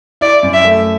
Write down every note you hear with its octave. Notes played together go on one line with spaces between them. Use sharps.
E4 D5
F#2
E5
A3